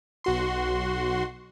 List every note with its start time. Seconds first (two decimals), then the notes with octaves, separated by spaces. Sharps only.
0.24 B1 F#4 C6